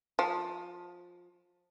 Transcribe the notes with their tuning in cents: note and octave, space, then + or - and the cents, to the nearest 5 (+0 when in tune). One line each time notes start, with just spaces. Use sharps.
F3 +20